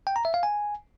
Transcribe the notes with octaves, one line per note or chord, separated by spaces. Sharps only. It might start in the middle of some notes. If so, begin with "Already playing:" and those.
G5
A#5
E5
F5
G#5